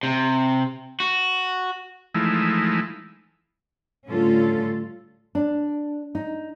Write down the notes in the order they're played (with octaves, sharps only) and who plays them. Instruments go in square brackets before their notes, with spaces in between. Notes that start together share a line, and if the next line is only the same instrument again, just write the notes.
[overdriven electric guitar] C3
F#4
[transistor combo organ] E3 F3 G#3 A3 D#4 E4
[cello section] A2 D3 G3 C#4 F4 A4
[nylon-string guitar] D4
D#4